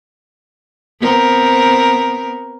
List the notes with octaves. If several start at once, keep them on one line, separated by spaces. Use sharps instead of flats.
B3 C4 A#4